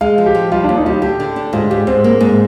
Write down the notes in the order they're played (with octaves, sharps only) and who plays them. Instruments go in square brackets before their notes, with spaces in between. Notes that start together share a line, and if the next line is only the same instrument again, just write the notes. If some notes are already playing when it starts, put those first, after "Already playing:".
[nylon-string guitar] G#3 [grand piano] F5
[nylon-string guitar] F3
[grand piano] G4
[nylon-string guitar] F3
[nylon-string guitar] G3 [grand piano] F4
[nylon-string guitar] D#2 [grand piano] D4
[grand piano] D#4
[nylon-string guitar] G3 [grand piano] F4 G4
[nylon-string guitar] D3 [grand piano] G4
[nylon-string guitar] D3
D4
[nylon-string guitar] G#2 [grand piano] F4
[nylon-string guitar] G#2 [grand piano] G4
[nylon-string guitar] G#2 [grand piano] C4
[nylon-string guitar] A#3
G#2